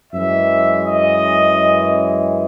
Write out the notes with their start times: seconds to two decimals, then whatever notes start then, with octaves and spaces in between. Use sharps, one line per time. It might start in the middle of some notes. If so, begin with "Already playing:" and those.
0.13 F#2 E3 G#3 E5
0.83 D#5